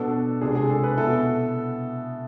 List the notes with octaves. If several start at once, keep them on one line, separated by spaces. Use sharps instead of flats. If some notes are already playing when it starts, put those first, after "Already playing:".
Already playing: B2 B3 D4 A4
C3 G#3 D4 G#4
G#4
A4
B4
B2 B3 E4 A4